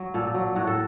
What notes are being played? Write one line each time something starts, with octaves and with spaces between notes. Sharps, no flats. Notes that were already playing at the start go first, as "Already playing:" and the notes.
Already playing: F#3
A#2 A4
F#3
A2 F#4
A4